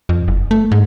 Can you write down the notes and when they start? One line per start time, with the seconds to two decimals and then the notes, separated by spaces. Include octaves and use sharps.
0.09 F2
0.28 F#1
0.51 A3
0.72 G#2